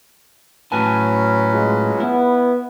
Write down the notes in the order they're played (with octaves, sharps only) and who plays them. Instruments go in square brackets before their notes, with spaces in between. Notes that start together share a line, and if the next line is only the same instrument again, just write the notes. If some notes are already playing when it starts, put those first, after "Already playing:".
[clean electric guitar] A2 G#5 A5 [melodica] F#3 C#4 B4
[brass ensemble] G#3 F4
[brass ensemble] B3 [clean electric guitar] E4